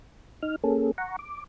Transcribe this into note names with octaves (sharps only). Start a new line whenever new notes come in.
D#4 F6
A#3 C#4 G#4 A4
F#5 A#5 C#6
D6